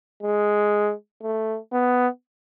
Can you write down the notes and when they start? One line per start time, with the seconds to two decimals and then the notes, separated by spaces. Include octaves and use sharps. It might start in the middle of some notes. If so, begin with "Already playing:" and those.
0.23 G#3
1.22 A3
1.73 B3